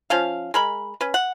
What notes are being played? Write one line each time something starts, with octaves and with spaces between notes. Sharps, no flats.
F3 C#4 F5
G#3 A#4 B5
C#4 B4
F#5